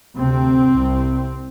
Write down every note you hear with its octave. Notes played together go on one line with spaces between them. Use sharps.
D2 C3 C4
C2 C3